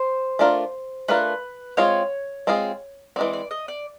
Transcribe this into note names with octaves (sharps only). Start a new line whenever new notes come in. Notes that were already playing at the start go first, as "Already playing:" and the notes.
Already playing: C5
A3 D4 F4 A#4
A3 D4 F4 A#4 B4
G#3 C4 F4 G#4 C#5
G#3 C4 F4 G#4
E3 G#3 C4 D5
D5
D#5
D5